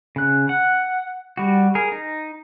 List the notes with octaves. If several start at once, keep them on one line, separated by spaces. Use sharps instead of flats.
C#3 F#6
F#5
G3 F#4
G#4 A#4
D#4